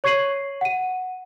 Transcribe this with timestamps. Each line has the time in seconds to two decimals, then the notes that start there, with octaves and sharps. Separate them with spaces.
0.04 C#5 C#6 G#6 C7 D#7 F#7
0.61 F#5 D#7